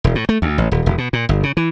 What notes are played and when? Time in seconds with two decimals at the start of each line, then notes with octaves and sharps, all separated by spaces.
0.04 E1
0.15 A2
0.29 A3
0.42 D2
0.58 A1
0.72 D#1
0.86 E1
0.98 B2
1.13 A#2
1.29 G1
1.43 C#3
1.57 E3